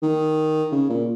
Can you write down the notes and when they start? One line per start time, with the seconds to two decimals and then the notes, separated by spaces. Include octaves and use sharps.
0.02 D#3
0.72 C#3
0.89 A#2